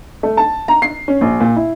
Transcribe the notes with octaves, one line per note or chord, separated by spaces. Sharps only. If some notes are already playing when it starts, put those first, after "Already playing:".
A3
A5
A#5
C7
C#4
A#1
A#2
E4